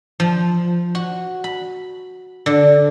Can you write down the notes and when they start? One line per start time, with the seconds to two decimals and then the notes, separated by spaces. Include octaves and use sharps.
0.20 F3
0.95 F#4
1.44 B5
2.46 D3